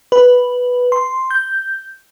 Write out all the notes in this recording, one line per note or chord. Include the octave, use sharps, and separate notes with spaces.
B4
C6
G6